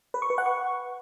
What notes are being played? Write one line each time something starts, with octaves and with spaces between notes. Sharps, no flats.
B4
C#6
B4
F#5
C#6